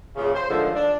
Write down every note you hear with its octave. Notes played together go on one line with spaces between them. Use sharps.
E2 A#2 C#3
C5
A2 D3 D#3 F3 G#3
D4